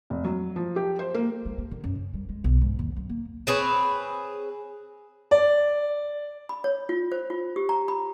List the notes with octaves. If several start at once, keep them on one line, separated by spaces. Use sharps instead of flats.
F1
F#3
F3
G4
C5
A#3
G#3
A#3
D3
F#2
C#3
G3
G#3
B1
G#2
D#2
F#2
A#3
C4 G#4 B4 C#5
D5
B5
C#5
F4
C5
F4
G4
A#5
B5